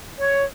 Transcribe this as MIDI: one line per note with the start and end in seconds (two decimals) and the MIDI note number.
0.19 0.43 73